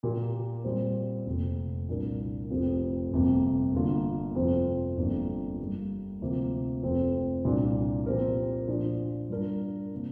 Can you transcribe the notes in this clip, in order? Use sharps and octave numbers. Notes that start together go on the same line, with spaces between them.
A#2 A#3 G4 A#4
A#2 G3 C4
F1 F2 C3 A#3
C2 A#2 A#3 D4 A#4
F1 F2 F3 C4 G4
G1 F2 C3 A#3
G1 G2 D3 A#3 F4
F2 C3 F3 C4 F4
G1 F2 F3 A#3 D4
G2 G3 A#3
D2 C3 F3 A#3
F1 F2 F3 C4
C2 A#2 A#3 D4
A#2 F3 C4 G4 A#4
A#2 F3 D4
G2 G3 D4 F4 A#4
C3 A#3